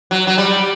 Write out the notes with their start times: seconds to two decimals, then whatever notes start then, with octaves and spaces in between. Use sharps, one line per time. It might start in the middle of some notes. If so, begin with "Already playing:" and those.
0.11 F#3
0.27 F#3
0.38 G3